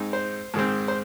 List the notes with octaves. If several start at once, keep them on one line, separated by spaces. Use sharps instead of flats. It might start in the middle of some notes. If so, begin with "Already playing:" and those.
Already playing: G#2 G#3 C4 D#4
C5
G#2 D#3 G#3 C4
C5